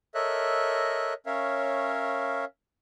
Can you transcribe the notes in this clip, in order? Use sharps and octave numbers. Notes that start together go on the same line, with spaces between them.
A4 A#4 C#5 D#5 E5 F#6
C#4 A#4 C#5 E5 F5